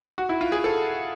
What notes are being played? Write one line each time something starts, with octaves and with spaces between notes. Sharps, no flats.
F#4
E4
F4
G#4
A4